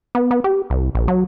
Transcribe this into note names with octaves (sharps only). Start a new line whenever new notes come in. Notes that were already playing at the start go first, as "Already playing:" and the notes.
B3
B3
G4
C2
A#1
F#3